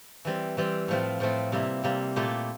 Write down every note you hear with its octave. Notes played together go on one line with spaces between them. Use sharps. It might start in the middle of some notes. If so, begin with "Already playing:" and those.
E3 G3 C4
E3 G3 C4
A2 F3 A3 C4
A2 F3 A3 C4
C3 G3 A#3 E4
C3 G3 A#3 E4
A#2 A3 E4 G4